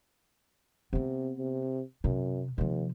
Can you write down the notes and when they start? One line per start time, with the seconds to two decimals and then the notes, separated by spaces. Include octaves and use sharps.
0.93 C3 B3 C4
1.39 C3
2.04 F#2 C3
2.58 D#2 C3 F3